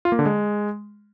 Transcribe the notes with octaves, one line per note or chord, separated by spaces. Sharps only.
F4
A#3
D3
G#3